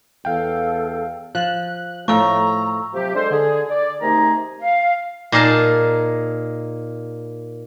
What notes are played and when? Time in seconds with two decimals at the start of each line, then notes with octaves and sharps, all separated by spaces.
0.25 E2 A4 F5 G5
1.35 F3 F#6
2.08 A2 F3 A3 A#5 C#6 E6
2.93 C3 F3 F#3 G4
3.15 G#3 D4 A4 C5
3.31 D3 G#4
3.69 D5
4.02 C3 D#3 A3 D#4 G#4 A#5
4.60 F5
5.32 A#2 D#4 G#4 A#4 A5